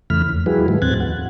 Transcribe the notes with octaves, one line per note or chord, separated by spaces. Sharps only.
F2 C#3 E3 A3 B5 F6
E2
F3 G3 E4 F#4 G#4 B4
G#2 D#3 F3 G3 A3
D#2 A2 C4 F#6 G#6 A6
F#5